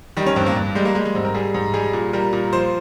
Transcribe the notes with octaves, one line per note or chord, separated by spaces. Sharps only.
D#3 G3
C#4
G2 C4
A#3
G2
G3 G#3
A#3
G3 G#3
G#3
G#2 C4
A#4
G3 G#4
G#2
G3 G#4
A#2
G3 A#4
A#2
F3 C5